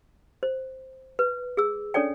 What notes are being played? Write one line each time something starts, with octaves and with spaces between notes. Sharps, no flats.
C5
B4
G#4 E6
C#4 D4 A4 C#5 D5 G5